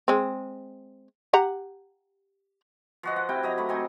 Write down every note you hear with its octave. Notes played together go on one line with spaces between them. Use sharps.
G#3 C4
G4 F#5 A#5
F3 F#4 D#5
F#5
C3 E4 G5
F#3 D#5 A#5
A3 B5
C4 D#4 G#5